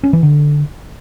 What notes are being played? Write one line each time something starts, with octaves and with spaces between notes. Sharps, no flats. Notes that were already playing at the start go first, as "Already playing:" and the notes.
C#4
E3
D3